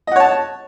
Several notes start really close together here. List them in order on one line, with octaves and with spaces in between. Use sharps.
D#5 F#5 C#5 A5